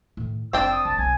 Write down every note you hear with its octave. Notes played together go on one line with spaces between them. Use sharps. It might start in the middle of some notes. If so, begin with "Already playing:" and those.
A2 D#3
F#1 C4 D4 F4 G5 E6
D#6
C2 G#3 A5
B1 G#5